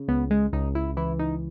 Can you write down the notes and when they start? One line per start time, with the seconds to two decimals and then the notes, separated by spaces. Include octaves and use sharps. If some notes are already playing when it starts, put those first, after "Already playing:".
Already playing: C#3
0.08 C#2 B3
0.31 G#3
0.53 C#2 D#4
0.75 E4
0.97 E3 E4
1.19 D#4